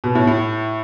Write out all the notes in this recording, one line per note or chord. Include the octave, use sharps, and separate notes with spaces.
B2
A2
A2